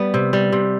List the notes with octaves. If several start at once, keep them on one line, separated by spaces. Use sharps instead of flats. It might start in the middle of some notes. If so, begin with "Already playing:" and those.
Already playing: G3 B3
C3
G3
C3